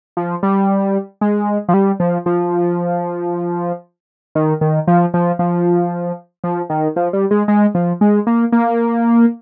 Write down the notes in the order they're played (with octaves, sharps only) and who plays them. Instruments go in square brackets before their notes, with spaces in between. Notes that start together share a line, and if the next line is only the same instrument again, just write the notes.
[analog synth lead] F3
G3
G#3
F3
G3
F3
F3
D#3
D#3
F3
F3
F3
F3
D#3
F3
G3
G#3
G#3
F3
G#3
A#3
A#3